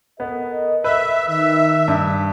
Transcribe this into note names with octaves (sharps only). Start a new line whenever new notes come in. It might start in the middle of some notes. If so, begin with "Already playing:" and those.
B3 A4 A#4 D#5
B4 E5
D#3 E5
G2